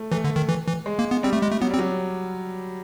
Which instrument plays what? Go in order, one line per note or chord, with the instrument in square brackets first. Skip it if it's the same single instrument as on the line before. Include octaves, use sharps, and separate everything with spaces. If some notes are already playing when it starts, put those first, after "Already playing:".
Already playing: [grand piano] A3
[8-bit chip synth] E3 [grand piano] A3
[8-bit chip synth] D3
D#3
E3
E3
[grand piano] G#3
[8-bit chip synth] A#3
B3
[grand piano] G3 [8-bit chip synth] C4
[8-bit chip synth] A3
G#3
A3
[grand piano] F#3 [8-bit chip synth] B3
[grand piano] G3 [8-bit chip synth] C4
[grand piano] F#3